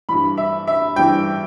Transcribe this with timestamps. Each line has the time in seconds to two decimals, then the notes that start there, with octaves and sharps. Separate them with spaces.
0.09 G2 E3 B5
0.38 E5
0.67 E5
0.96 G2 E3 G5